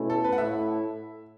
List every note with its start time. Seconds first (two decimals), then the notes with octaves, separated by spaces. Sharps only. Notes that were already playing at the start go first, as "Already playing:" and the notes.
Already playing: B2 A3 C#4 E4
0.10 A4
0.24 B4
0.32 F#5
0.38 A2 A3 E4 E5